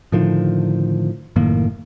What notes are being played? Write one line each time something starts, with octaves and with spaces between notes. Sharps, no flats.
A2 D3 D#3 F3
F#1 A2 D#3 A#3